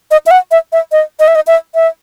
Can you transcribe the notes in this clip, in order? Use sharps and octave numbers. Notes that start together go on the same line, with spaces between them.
D#5
E5
F#5
E5
E5
D#5
D#5
E5
D#5
E5
E5